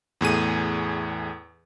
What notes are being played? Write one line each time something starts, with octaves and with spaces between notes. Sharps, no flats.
E2 A2 G#4 D#7